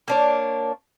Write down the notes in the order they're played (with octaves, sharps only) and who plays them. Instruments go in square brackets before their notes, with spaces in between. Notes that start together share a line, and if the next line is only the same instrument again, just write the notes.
[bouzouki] A#3 D4 C#5